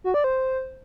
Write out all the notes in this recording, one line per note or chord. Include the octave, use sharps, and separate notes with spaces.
F#4
D5
C5